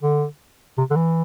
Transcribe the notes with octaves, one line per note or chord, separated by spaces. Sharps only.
D3
C3
D3
E3